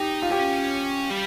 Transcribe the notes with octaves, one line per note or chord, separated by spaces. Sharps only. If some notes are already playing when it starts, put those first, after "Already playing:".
Already playing: D#4 G4
F4
C#4 G4
G3